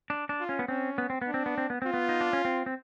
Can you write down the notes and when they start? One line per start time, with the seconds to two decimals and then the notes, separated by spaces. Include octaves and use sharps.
0.10 D4
0.29 D4
0.40 F4
0.49 C#4
0.59 B3
0.68 C4 C#4
0.98 B3
1.10 C4
1.22 B3
1.27 D4
1.34 C4
1.46 B3
1.58 C4
1.70 B3
1.82 C4 F4
1.94 B3
2.09 D#4
2.21 D4
2.33 C#4
2.45 C4
2.66 C4